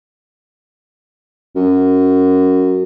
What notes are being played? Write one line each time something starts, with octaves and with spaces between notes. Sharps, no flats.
F#2